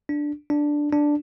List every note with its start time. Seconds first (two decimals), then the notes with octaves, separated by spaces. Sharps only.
0.09 D4
0.50 D4
0.92 D4